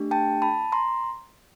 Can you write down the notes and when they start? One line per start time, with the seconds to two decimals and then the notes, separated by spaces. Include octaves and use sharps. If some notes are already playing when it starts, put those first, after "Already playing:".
Already playing: A3 D4 G4
0.11 G5 A5
0.42 A5 B5
0.72 A#5 C6